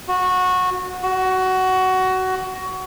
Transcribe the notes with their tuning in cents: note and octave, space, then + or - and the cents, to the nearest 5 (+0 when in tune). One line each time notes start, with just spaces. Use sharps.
F#4 -15
F#4 +15